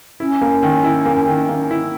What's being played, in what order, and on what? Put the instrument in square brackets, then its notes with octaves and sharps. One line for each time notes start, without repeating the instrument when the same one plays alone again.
[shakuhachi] C#4 [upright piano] E4
[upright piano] A#3
D#3
E4
A#3
D#3
A#3
E4